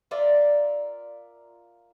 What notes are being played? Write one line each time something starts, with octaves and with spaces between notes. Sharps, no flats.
F4 A#4 D5 E5